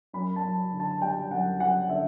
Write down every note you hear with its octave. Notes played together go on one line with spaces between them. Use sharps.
F#2 B5
A5
F#2
D3
A5
G3 G5
F#2 F#5
F#2 F#5
D3 E5